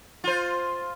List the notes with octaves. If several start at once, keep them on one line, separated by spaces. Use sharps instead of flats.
F4 C5